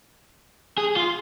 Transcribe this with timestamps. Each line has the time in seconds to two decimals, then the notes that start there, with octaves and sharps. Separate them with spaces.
0.78 G#4
0.96 F4